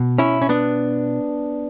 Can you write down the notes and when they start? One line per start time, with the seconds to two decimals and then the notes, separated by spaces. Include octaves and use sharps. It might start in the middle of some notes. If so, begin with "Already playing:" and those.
Already playing: B2
0.18 C#4 E4
0.42 C#4
0.49 B3 D4